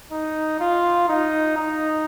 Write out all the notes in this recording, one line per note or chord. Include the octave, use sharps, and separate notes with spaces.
D#4
F4
D#4
D#4